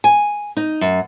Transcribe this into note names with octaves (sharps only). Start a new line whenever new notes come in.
G#5
D#4
F#2